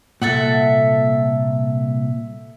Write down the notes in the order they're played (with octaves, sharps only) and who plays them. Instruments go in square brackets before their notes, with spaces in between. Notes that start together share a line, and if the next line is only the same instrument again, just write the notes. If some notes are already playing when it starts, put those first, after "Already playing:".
[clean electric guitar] C2 A#2 [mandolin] A4 E5 F#5